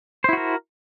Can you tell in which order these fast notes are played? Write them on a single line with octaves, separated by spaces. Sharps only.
C5 E4 F#4 A#4